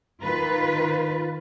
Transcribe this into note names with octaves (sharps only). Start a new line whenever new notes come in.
D#3 F4 B4